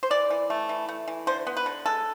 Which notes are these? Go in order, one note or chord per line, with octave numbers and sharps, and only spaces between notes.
C5
E3 D5
E3
A3
E3
A3
E3
D3 C5
B3
B4
D3
G#3 A4